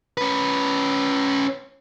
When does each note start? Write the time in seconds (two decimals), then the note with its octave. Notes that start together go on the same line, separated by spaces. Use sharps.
0.18 C#4 B4